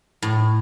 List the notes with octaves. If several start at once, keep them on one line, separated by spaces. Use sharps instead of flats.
A2